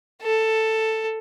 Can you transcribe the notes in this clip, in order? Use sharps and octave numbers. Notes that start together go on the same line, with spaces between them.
A4